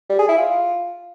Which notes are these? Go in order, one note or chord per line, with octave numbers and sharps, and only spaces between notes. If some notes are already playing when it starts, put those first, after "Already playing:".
G3
G#4
E4
F4